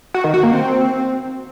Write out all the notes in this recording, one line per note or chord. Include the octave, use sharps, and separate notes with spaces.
F#4
D#3
F#4
A#3
C4